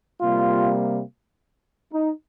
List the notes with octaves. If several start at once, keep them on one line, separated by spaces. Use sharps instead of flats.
C3 G3 A#3 F4
D#4